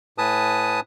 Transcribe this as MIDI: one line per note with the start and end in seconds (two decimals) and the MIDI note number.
0.18 0.80 45
0.18 0.80 71
0.18 0.80 80
0.18 0.80 81
0.18 0.80 87